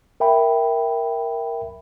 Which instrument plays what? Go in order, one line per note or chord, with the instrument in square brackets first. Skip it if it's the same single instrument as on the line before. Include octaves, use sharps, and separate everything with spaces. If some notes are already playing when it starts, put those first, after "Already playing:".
[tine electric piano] A#4 E5 G5 B5